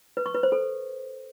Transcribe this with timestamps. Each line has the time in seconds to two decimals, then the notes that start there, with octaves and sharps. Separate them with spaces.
0.17 B4
0.26 C#6
0.34 B4
0.43 C5
0.52 A4